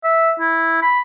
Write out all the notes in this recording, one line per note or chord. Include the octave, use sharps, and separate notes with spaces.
E5
E4
B5